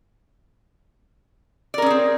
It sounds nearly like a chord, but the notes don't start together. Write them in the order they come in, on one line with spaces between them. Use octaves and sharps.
D5 A#4 C#4 G#4 C4